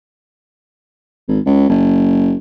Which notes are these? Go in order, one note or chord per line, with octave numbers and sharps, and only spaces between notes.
G#1
C#2
F#1